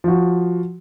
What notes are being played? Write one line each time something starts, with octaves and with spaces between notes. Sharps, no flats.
F3 F#4